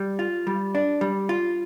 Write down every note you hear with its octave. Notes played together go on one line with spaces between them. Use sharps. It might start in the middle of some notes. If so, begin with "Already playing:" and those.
Already playing: G3
F4
G3
D4
G3
F4